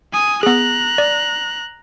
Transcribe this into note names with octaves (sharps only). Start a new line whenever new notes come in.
G#5 D#6
B3 G#4 A#5 F#6
D5